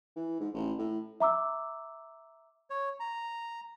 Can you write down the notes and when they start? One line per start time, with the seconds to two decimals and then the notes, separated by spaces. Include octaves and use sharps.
0.16 E3
0.40 G#2
0.54 A1
0.79 A2
1.20 E5 A#5 D6 E6
2.70 C#5
3.00 A#5